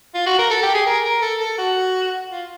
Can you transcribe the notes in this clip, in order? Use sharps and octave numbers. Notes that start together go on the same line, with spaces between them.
F4
F#4
A#4
A4
G4
G#4
A#4
A#4
A4
A4
F#4
F4